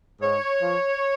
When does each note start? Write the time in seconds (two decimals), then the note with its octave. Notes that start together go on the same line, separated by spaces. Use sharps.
0.21 G#2 C#5
0.61 F3